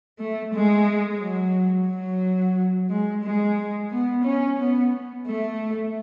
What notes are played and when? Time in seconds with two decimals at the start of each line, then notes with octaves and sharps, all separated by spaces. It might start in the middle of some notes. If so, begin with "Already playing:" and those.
0.19 A3
0.54 G#3
1.21 F#3
1.89 F#3
2.90 G#3
3.24 G#3
3.91 B3
4.25 C#4
4.58 B3
5.26 A3